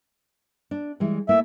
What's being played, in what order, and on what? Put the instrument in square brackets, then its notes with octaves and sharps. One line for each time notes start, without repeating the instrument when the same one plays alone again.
[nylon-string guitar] D4
E3 G3 G#3
[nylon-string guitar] A3 A#3 E4 [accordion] E5